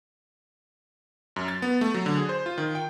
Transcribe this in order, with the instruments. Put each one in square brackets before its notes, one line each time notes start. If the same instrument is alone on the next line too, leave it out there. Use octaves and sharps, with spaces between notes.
[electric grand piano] F#2
A6
B3
A3
F#3
D3
G#4
C5
F4
D#3
G5